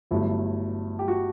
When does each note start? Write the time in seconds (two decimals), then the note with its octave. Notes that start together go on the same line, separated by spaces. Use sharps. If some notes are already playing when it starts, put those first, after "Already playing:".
0.11 G1 G2 F#3 A3 E4
0.99 G4
1.08 F#4